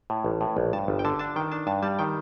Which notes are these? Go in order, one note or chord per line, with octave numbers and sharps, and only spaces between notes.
A2
A1
A2
A#1
G2 A5
G1
G5
D3 A5
D4 A5
D#3 G5
D4 A5
G2 A5
G3 A5
D#3 G5